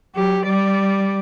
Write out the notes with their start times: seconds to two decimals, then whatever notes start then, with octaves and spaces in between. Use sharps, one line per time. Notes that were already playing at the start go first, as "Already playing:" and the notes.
0.15 F#3 G4
0.47 G3 D5